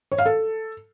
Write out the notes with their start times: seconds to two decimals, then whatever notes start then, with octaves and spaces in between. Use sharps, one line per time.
0.12 C#5
0.18 F5
0.25 A4